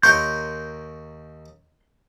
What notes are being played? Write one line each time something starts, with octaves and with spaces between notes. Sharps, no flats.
D#2 A#4 C#5 C6 G6